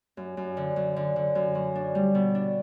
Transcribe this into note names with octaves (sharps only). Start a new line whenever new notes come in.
F#2
F#2
D3
F#2
D3
D3
F#2
F#3
D4
G3
B2
D4